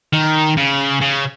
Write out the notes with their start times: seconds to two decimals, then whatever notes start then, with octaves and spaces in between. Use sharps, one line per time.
0.13 D#3
0.57 C#3
1.01 C#3